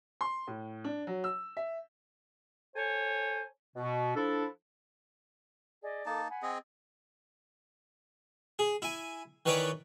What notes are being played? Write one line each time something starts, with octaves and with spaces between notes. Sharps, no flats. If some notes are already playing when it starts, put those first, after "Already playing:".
C6
A2
D4
F#3
E6
E5
A4 C5 C#5 G#5
B2
F3 D4 E4 A4
G#4 D5 D#5
A#3 D#4 A4 A5 D6
F#5 G#5 B5
C4 G#4 D#5
G#4
E4 G#5
D#3 E3 B4 C#5 D5 D6